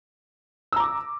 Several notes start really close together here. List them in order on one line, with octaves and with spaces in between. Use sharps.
E6 A#5 D6